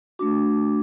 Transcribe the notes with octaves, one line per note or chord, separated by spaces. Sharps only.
A3 D4 F#4 D6